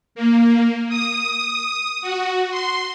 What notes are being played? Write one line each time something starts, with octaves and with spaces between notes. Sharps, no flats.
A#3
D#6
F#4
C6